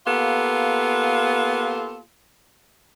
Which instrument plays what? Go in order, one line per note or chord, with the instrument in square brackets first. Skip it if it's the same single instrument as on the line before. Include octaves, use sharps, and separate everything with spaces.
[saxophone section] A#3 B3 F4 G4 A4